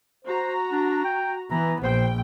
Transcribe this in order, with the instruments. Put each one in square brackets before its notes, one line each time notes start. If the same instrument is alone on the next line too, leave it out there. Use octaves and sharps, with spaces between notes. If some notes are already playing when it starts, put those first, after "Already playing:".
[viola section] F#4 A#5 [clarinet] C5
[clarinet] D4
G5
[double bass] E3 [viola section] B3 [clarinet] A#5
[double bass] A#1 [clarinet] C5 [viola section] G5